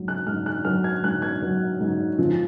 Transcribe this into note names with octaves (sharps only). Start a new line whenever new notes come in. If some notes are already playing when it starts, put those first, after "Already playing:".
Already playing: G#2 F#3
F#6
G#2 F6
F#6
F#3 F6
G#6
G#2 F#6
G#6
F#3
G#2
F3